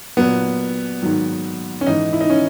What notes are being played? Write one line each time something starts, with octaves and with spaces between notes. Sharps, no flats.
A#2 F#3 B3
G#2 D#3 F#3
C#4
G#2 E3 D#4
E4
D#4
C#4